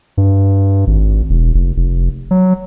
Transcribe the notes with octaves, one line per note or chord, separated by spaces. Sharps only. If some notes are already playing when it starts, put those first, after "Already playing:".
G2
G#1
E1
F1
F1
F#3